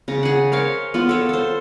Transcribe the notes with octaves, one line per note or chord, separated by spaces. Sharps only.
C#3 A#5
G#4 F#5
A#4 C5 C#5 F5
B3 F4
A4 C#5
A4 C5